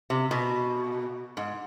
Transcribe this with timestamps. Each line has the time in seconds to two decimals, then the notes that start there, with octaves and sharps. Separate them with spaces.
0.10 C3
0.31 B2
1.37 G#2